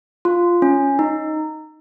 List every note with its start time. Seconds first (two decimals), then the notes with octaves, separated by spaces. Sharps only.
0.25 F4
0.62 C#4
0.99 D#4